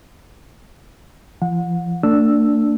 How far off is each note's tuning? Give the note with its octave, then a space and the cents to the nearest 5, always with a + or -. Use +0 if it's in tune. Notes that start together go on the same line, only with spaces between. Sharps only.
F3 -40 F#5 -35
A3 +45 D4 +0 E6 +0